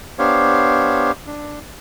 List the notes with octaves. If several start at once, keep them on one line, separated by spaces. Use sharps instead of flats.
B3 D4 G4 C5 C#5 F5
D4